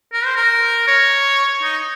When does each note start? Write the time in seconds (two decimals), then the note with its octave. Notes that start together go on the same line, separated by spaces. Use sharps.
0.13 A#4
0.25 C5
0.36 A#4
0.88 C#5
1.63 D#4